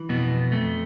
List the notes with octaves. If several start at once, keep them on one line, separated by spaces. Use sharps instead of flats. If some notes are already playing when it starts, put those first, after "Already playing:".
Already playing: E3
F2 B2 B3
F2 A3